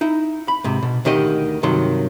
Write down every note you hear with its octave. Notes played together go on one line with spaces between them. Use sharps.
D#4 E4
B5
G#2 C3
B2
D2 D#3 G4 D#5
G2 C3 D#3 F#3 C6